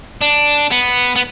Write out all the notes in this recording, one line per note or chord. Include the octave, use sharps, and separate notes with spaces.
D4
B3
B3